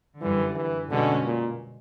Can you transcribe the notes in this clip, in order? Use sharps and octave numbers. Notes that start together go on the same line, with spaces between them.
F#2 D3 E3 G3
E3
B2 D3 G#3 C#4
A#2